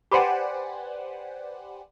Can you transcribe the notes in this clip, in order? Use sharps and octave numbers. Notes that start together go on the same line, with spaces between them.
G4 B4 C5 D5 F#5 G#5